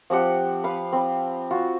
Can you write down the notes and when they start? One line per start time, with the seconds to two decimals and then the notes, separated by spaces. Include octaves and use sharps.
0.10 F3 C4 G4 F#5
0.64 B4 F5
0.92 C4 B5
1.51 F4 F#4